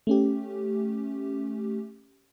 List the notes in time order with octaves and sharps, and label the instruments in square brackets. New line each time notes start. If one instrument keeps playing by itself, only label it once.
[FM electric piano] A3 C#4 G4